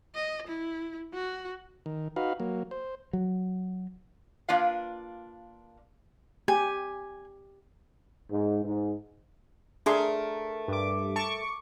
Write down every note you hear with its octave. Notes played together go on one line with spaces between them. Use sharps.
D#5
E4
F#4
D#3
D#4 F#4 B4 F5
F#3 A#3
C5
F#3
A#3 D4 F4 B4 D5 F5
G4 G#5
G#2
G#2
A3 D4 G#4 A#4 C6
G2 D6
A5 C#6 D6